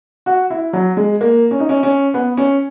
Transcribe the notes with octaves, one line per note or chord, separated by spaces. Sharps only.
F#4
E4
F#3
G#3
A#3
C#4
D#4
C#4
C#4
B3
C#4